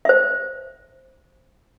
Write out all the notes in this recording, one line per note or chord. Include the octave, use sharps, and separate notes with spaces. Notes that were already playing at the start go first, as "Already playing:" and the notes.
C5 E5